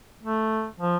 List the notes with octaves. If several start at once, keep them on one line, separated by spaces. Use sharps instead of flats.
A3
F3